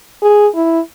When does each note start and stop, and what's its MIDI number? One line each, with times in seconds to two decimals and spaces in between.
0.22 0.47 68
0.55 0.80 64